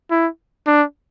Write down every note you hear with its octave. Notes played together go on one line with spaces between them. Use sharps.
E4
D4